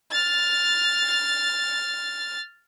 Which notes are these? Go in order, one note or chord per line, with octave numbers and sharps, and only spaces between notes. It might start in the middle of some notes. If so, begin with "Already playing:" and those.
F6 A6